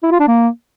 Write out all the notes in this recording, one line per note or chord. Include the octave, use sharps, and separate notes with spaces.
E4
F4
D4
A#3